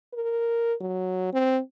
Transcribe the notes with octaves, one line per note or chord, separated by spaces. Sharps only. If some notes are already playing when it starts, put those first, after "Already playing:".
A#4
F#3
C4